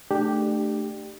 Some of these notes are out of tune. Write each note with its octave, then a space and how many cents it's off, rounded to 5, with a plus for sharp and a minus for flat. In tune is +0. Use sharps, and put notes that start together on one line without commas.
A3 +0 D4 +30 G4 +0